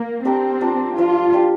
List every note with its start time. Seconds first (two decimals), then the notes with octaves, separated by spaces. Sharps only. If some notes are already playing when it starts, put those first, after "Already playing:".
Already playing: A#3 A#4
0.24 C4 D4 G4 A#4
0.61 F3 D4 A#4
0.97 F3 D4 F4 A#4
1.33 D4 G4 D5